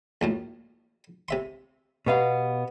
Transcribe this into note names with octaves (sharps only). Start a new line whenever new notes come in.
A#1 F#2 A2
C3 E5 C6
B2 B3 G4 B4 F5 F#5